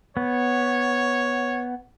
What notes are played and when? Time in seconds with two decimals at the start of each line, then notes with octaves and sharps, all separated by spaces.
0.17 B3 C#5